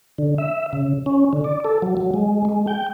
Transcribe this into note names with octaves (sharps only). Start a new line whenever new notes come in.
D3
E5
C#3
C#4
D3
D5
A4
F#3
F#3
G#3
G#3
G5